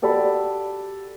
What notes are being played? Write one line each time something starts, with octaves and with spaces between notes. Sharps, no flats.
F#4 G4 A4 D5 A5 B5